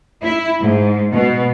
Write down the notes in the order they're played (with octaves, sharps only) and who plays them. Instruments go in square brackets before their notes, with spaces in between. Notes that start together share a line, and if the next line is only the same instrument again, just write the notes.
[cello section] E4
G#2
B2